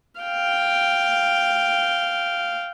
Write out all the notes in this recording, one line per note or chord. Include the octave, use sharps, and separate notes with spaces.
F5 G5